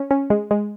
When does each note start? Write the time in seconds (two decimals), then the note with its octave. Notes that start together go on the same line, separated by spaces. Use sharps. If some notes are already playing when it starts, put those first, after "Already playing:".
Already playing: C#4
0.11 C#4
0.30 G#3
0.51 G#3